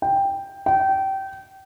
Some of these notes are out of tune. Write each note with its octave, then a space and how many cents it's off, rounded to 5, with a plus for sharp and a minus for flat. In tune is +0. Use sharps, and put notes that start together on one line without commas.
G5 +5
G5 -25